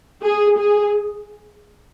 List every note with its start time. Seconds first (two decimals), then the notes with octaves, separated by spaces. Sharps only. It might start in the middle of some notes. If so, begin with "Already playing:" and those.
0.22 G#4
0.58 G#4